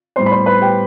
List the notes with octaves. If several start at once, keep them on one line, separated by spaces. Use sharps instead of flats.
A2 G3 B3 C5 C6
B5
C5 C6
B4 B5
G4 G5